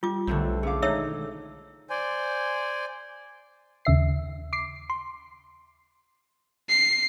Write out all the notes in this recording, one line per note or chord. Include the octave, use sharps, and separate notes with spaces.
G3 F4 D6
B1 D3 A3 C4
C2 A3 C#4 G#4 F5 D6
B2 D#3 G#3 D#4 C#5 E5 E6
C5 D5 G#5
D#2 C#3 E5 C7
D6 C7
C6
C7